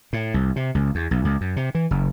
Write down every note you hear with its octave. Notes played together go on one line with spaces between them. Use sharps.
A2
C2
C3
C#2
E2
B1
C#2
F#2
C3
E3
F#1